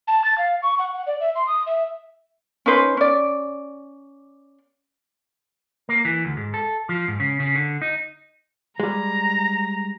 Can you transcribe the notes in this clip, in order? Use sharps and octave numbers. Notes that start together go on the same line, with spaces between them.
A5
A6
F5
C#6
F#5
F#5
D5
E5
C6
D#6
E5
C#4 D#4 B4 C5
C#4 D5
A#3
E3
D2
G#2
A4
F3
G#2
C#3
C#3
D3
D#4
G3 G#3 A#5